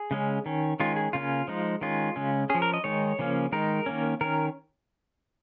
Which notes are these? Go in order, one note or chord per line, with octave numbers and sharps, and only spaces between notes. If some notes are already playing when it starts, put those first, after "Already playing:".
Already playing: G#4
C#3 G#3 C#4
D#3 C#4
D#3 G#3 C#4 F4
G#4
C#3 A#3 C#4 F4
F3 G#3 D#4
D#3 G#3 C#4 F4
C#3 G#3 C#4
C#4 G#4
F3
A#4
D#5
D#3 G#3 D#4 C#5
C#3 F3 A#3 C#4
D#3 G#3 D#4 A#4
D#3 A#3 C#4
D#3 C#4 A#4